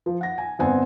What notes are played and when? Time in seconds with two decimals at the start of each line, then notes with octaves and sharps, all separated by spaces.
0.06 F3
0.21 F#5 A#6
0.38 G#5
0.59 G1 B3 C4 F#5 G#5